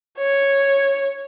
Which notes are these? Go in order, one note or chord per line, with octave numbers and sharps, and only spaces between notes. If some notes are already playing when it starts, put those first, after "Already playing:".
C#5